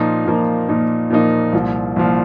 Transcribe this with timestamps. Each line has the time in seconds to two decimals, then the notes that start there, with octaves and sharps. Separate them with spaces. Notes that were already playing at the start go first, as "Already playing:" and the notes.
Already playing: A#2 F3 A#3 D#4
0.26 A#2 F3 A#3 D#4
0.69 A#2 F3 A#3 D#4
1.10 A#2 F3 A#3 D#4
1.53 C2 A#2 F3
1.96 C2 A#2 F3